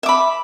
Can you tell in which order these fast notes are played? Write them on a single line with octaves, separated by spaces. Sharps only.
E5 D6 B5